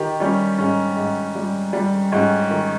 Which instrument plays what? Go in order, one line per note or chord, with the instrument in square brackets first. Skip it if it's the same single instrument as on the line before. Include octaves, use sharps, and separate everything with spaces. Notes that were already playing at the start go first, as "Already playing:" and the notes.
Already playing: [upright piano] D#3 G4
G3 C#4
G#2 C#4
G#2
G3
G3
G#2 C#4
D#3